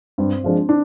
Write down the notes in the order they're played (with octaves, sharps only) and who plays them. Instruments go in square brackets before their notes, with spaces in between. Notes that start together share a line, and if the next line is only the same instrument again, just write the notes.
[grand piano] G2 [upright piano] C4
[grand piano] F3 G#3 D4 F4
[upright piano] D4